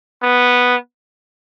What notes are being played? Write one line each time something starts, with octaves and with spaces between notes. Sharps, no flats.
B3